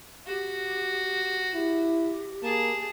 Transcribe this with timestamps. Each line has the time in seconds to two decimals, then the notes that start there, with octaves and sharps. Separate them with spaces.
0.27 F#4 G4
1.55 E4 G4
2.43 A#3 G#4 A5